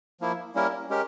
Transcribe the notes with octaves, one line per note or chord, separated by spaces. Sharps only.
F3 A#3 E4
G3 A#3 C#4 E4 A#4
G#3 C#4 G4 A#4